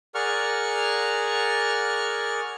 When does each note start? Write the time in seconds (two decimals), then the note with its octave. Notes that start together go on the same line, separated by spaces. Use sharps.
0.15 G#4 A#4 D5 F#5 C#6 F6